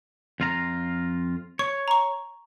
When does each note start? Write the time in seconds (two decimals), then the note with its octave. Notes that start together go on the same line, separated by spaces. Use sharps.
0.40 F2 F4 A#5
1.59 C#5 C#6
1.88 A#5 C#6